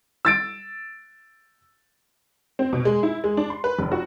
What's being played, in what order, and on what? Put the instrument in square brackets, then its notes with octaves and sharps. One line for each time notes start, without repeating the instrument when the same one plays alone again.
[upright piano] E6 A6 D7
[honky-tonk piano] C4
B2
G#3
E4
G#3
D4
C6
B4
F1
F#4